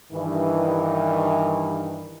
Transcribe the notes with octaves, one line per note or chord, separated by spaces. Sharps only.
G2 D#3 E3